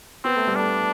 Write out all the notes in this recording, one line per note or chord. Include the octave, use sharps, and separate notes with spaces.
B3 C4
A3
G3
A3 D4